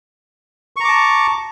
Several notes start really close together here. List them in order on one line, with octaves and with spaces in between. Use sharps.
C#6 A#5 D6 A5